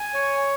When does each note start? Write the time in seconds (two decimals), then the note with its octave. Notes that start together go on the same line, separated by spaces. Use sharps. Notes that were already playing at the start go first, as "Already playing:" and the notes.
Already playing: G#5
0.14 C#5